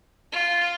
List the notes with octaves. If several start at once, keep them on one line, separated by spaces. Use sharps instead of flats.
F4